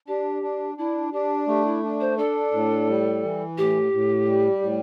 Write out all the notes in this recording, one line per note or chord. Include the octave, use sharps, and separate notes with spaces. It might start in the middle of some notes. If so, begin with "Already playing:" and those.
D4 G4
D4
D4 E4
D4 G4
A3 G4
E4
D4
C5
D4 A4
A2
G3
E3
A2 G4
A2
G3
A2